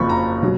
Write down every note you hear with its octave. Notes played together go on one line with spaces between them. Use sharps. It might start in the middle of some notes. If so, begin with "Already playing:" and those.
Already playing: F#1 F2 F3 B5 C#6
A#5
B2 F#3